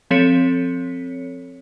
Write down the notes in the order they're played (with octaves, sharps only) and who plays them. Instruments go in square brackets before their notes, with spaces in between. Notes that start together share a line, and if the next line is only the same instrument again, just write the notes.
[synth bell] F3 C4 A4 C#5 B6 C#7